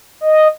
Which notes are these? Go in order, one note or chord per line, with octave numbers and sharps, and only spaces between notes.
D#5